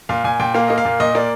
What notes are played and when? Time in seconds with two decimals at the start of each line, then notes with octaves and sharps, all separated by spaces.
0.09 A#2 F5
0.24 A#2 G#5
0.40 A#2 G5
0.55 A#3 F5
0.68 A#3 D#5
0.78 F5
0.85 A#2
1.00 A#2 D#5
1.15 A#3 D5